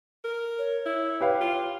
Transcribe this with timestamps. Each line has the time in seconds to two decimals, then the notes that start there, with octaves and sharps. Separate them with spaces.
0.24 A#4
0.58 C#5
0.86 E4
1.21 G4 B4 F5
1.41 F4